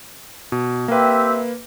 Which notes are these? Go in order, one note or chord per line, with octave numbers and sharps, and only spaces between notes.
B2
A#3 C4 G4 B4 E5